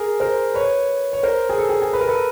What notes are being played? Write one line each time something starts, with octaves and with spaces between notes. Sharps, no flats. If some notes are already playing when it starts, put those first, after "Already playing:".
Already playing: G#4 A#4
A#4 C5
B4 C#5
C#5
A#4 C5
G#4
A4
G#4
G#4
B4
A#4
A4 B4